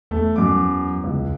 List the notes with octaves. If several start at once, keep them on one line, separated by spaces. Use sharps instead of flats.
E2 A3
F#2 D6
C#2